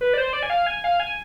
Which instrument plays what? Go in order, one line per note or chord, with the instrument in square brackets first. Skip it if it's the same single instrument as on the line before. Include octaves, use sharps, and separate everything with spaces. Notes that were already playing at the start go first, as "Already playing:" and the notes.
[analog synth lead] B4
D5
C5
D5
G#5
F5
G#5
F5
G#5